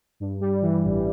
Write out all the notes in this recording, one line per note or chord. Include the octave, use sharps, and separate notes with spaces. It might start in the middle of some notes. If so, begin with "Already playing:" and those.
G2
G3
E3
A1